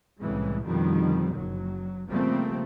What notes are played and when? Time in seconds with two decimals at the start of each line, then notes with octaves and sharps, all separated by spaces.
0.20 C2 A2 C#3 E3 G#3
0.66 F2 B2 D3 D#3 F3 G3
1.34 F#1 F#3
2.08 C#3 F3 G3 A3 A#3 C4